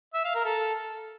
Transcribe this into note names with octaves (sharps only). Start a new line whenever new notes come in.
E5
F5
A#4
A4